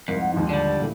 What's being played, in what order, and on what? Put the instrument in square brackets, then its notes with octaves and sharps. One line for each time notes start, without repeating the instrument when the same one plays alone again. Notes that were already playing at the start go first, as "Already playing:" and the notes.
[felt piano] C2 G#2 [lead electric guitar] F2 [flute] A#4
[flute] F#5
[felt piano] D#2 G#2 F3 [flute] D#4
[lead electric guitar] D3 G3 [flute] D5
[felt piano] A#2 E3 A3